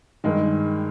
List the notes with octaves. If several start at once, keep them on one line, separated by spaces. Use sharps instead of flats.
G2 D#3 G#3